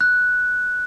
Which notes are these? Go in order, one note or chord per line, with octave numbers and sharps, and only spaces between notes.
F#6